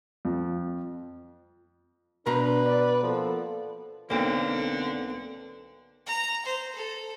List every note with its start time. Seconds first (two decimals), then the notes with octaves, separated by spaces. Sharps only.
0.25 F2
2.26 B2 D4 B4 C5 A#5
2.64 D5
3.03 F3 A#3 B3 A4
4.10 B1 D3 A#3 C4
6.06 A#5
6.46 C5
6.75 A4